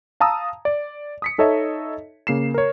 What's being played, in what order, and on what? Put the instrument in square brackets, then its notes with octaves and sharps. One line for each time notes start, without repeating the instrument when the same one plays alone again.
[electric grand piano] F5 A5 A#5 D#6 E6
D5
D#6 B6 C#7
D#4 A4 C#5 D#5 E5
C#3 A#3 C7 E7
A#4 C#5